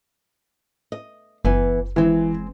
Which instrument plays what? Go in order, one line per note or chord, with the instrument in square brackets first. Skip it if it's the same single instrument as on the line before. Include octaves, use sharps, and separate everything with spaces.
[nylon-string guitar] D#5
[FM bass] F#1 [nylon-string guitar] E3 B3 G#5
[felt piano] E3 [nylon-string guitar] G#3 C4